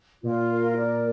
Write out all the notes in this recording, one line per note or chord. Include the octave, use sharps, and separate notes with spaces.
A#2 F4
A#4
D5